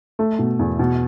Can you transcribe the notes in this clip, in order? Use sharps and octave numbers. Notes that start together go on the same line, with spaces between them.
A3
B2
E2
B2